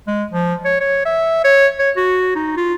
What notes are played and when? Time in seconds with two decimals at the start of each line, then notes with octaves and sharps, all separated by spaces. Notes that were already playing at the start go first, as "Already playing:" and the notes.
0.07 G#3
0.31 F3
0.65 C#5
0.80 C#5
1.05 E5
1.44 C#5
1.79 C#5
1.97 F#4
2.35 D#4
2.57 F4